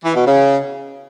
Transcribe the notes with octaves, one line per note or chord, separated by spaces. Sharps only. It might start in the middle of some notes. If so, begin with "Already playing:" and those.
E3
B2
C#3